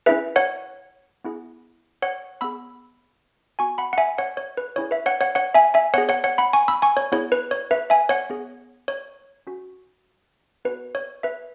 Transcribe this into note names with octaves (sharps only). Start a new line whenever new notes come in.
C#4 E4 G#4 B4 E5
C#5 F#5
B3 E4 G#4
C#5 F#5
B3 G#4 B5 E6
B3 F#4 G#5 C#6
F#5 B5
F#5
E5 G#5
C#5 F#5
C#5
B4
C#4 E4 G#4 C#5
B4 E5
C#5 F#5
C#5 F#5
C#5 F#5
E5 G#5
E5 G#5
B3 G#4 C#5 F#5
C#5 F#5
C#5 F#5
F#5 B5
G#5 C#6
B5 E6
G#5 C#6
C#5
B3 E4 G#4 C#5
B4
C#5
B4 E5
E5 G#5
C#5 F#5
B3 G#4
C#5
C#4 F#4
B3 F#4 B4
C#5
B4 E5